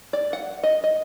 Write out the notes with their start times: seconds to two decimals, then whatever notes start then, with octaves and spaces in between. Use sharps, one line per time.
0.13 D5
0.33 F#5
0.63 D#5
0.84 D#5